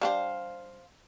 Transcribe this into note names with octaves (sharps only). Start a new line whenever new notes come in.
G3 D4 G4 C5 F5